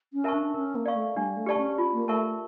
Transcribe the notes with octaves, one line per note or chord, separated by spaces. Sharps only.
C#4
A#4 E5 A5 C#6
D4
C#4 A#4
A#3
D5 F5 C#6
A3
G3 D4
A3
G4 D5 A5 C#6
C#4
F4
A#3
A3 A#4 E5 A5 C#6